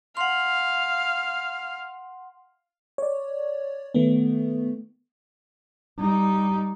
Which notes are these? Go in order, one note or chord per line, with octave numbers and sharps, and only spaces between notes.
F5 F#5 C6
C#5 D5
D#3 A3 B3
G3 D#4